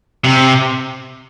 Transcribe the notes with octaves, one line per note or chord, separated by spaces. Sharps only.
C3